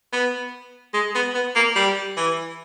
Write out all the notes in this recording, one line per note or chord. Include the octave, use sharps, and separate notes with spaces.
B3
G#3
B3
B3
A#3
G3
E3